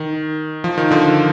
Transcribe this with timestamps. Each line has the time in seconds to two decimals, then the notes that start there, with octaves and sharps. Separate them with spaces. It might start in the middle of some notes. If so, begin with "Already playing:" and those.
Already playing: D#3
0.64 F3
0.78 D#3
0.91 D3 F3